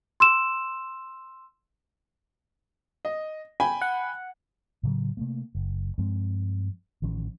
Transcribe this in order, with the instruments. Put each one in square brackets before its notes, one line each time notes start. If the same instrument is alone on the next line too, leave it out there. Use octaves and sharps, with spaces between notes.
[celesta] C6 E6 E7
[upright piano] D#5
G5 G#5 B5
[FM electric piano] F#5
[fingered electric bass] A2 C#3 F#3
C3 A3 A#3
F#1
G2 F3 G#3 C4
A1 D#3 F3 C#4